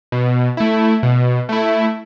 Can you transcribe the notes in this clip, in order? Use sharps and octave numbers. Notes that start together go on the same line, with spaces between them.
B2
A3 E4
B2
A3 E4